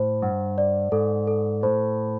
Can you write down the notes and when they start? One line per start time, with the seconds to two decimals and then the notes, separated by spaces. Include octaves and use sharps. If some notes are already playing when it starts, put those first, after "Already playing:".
Already playing: A2 C5
0.22 G2 F#5
0.58 D5
0.92 G#2 A4
1.27 A4
1.63 A2 C5